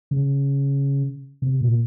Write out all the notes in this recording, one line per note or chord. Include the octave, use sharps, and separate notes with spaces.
C#3
C3
A#2